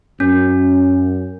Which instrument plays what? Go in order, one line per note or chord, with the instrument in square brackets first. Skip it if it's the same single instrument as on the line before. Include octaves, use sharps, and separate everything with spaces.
[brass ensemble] F#2 [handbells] C#4